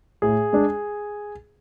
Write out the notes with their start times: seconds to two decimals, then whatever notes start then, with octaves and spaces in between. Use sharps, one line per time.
0.22 A2 G#4
0.53 G#3 D4